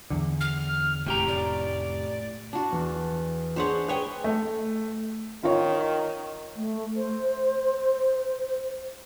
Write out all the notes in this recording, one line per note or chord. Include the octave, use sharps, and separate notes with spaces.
E2 D3
F6
F1 A2 G4 G5 A#5
D5
D4 F#4
E2
D4 G#4 C5 C#5 F#5
G#4 B4 C#5 G5
A3
D#3 F4 C#5
A3
C5